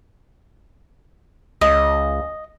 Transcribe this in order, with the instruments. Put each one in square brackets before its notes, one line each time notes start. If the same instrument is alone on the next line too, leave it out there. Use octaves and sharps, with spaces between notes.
[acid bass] C#2 [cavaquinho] D#5